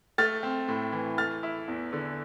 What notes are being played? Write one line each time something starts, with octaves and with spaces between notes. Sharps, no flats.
A3 F6 A6
C4
A2
E3
A3 F6 A6
E4
E2
D3